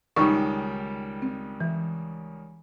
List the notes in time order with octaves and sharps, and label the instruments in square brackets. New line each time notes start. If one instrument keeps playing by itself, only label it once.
[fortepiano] C#2 D#3 G3 [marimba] D#4 C#6
[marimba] C4
E3